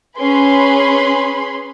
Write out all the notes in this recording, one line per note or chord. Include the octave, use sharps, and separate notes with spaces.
C#4 G#4 B4 B5 C6